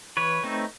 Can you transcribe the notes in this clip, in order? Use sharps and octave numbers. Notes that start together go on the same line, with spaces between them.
E3 B4 C#5
A3 C4 D#4